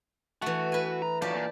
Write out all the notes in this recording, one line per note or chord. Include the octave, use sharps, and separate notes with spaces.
E3 A3 F#4
B4 G#5
A#5
F3 F#3 G4 D5 A5
A#2